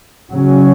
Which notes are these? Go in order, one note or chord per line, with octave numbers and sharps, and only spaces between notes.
C#3 F#3 C#4